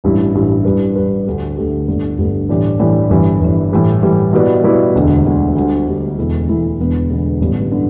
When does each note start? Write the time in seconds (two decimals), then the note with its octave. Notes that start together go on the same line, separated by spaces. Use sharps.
0.04 A1 G2 G3 E4
0.35 A1 G2 G3 E4
0.65 G2 G3 D4 B4
0.96 G2 G3 D4 B4
1.27 D2 D3 A3 G4
1.57 D2 D3 A3 G4
1.88 G1 G2 D3 A3
2.18 G1 G2 D3 A3
2.49 A2 E3 G3 D4 G4
2.80 A2 E3 G3 D4 G4
3.10 G1 G2 E3
3.41 G1 G2 E3
3.72 A2 E3 G3
4.03 A2 E3 G3
4.33 B2 G3 E4 B4 D5
4.64 B2 G3 E4 B4 D5
4.95 E1 D2 D3
5.26 E1 D2 D3
5.56 D2 D3 G3
5.87 D2 D3 G3
6.18 E1 E2 E3 A3 E4
6.48 E1 E2 E3 A3 E4
6.79 E1 E2 D3 B3
7.10 E1 E2 D3 B3
7.40 A1 G2 D3 B3
7.71 D3 B3